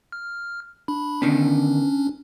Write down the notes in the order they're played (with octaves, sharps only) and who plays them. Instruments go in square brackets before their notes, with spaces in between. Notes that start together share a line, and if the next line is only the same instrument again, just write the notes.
[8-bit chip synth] F6
D4 B5
[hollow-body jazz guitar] D3 D#3 B3 [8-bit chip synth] C#4 D4